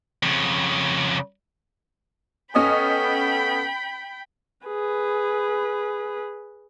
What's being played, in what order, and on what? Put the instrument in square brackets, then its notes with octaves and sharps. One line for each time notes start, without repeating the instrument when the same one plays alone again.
[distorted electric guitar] F2 C#3
[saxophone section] B3 A4 [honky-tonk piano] C#4 D#5 [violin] G5 B5
[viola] G#4 B4